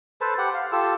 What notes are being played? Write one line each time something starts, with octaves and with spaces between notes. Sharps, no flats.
A4 B4 C5 A5
G4 F#5
F5
F4 G4 A4 E6